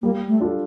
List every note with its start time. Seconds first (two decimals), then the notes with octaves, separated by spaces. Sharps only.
0.02 G3 A#3
0.27 A3
0.40 D4 F4 A4